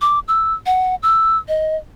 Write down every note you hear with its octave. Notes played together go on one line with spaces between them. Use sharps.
D6
E6
F#5
E6
D#5